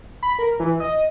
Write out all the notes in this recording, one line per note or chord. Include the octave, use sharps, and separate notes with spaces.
B5
A#4
E3
D#5